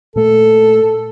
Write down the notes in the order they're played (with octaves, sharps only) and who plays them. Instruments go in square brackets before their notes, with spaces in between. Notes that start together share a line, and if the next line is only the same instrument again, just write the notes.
[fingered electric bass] A#2 A3 [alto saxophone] A4